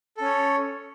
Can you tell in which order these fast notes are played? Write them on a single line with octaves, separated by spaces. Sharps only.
A4 C#4 C#5